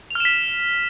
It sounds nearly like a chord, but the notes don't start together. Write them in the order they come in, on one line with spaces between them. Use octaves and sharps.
F7 F6 E7 B6